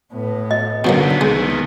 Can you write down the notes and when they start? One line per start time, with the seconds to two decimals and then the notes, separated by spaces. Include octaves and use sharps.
0.13 A2 B3
0.51 D#5
0.85 B2 D3 D#3 F#3 A#3 B3
1.21 C2 G#3